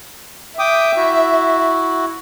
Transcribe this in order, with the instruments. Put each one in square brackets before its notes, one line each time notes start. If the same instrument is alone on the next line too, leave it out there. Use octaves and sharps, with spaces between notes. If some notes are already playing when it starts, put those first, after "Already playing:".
[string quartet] E5 [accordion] G5 D6 D#6
[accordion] E4 F#4